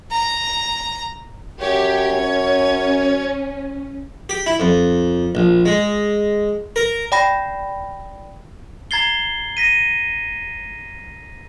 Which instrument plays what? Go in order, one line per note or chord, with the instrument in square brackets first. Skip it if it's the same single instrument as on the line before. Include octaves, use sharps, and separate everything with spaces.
[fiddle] A#5
[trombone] F#2 [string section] G4 [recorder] C#5
[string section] C#4
[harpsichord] G4
E4
F2
A#1
G#3
A#4
[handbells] D5 G5 B5 A#6
[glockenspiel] A#5 G#6 A6 C7 G7
A#6 B6 D#7